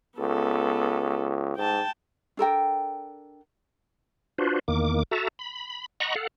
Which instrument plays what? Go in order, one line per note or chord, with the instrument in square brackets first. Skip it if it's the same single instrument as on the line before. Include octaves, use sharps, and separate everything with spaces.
[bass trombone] C#2 [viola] B3 A4
[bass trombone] G#2 [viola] G5 A5
[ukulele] D4 A4 A#4 G5
[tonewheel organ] D4 F4 F#4 B4 C5
E2 D#3 A#3 D6
F#4 A4 E5 A5 A#5
B5
D#5 F#5 A#5 B5 C#6
A4 F5 F#5